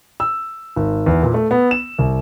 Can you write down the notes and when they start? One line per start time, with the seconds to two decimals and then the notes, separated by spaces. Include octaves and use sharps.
0.20 E6
0.76 G#1
1.06 E2
1.23 A#2
1.34 A3
1.51 B3
1.71 E7
1.99 C2